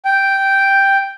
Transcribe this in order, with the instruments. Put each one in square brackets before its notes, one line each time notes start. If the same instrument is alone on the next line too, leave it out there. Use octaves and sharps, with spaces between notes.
[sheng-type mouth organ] G5